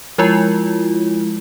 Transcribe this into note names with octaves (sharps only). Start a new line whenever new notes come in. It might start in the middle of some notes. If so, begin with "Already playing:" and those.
F3 G#3 E4 F4